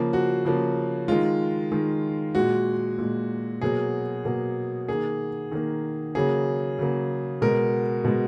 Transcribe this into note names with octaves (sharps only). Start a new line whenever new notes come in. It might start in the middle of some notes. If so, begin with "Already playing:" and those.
Already playing: C#3 F3 A#3
F#4
C#3 F3 A#3
D#3 G#3 F4
D#3 G#3
A#2 G#3 F#4
A#2 G#3
B2 F#3 A#3 G#4
B2 F#3 A#3
D#3 A#3 G#4
D#3 A#3
C#3 F#3 A#3 G#4
C#3 F#3 A#3
B2 G#3 A#4
B2 G#3